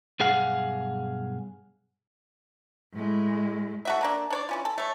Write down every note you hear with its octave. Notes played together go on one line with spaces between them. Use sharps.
B1 G2 G#4 F5 F#5
A2 G#3
A3 F#4 E5
D3 A#3 D4
D4 C#5 D5
E3 C#4 F4
A4
A3 C#5